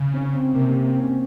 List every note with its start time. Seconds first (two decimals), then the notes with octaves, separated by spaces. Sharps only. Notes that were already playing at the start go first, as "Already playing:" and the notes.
Already playing: C#3
0.13 C#4
0.33 C4
0.54 C3 A#3
0.69 A#3
0.84 C4
1.00 C#4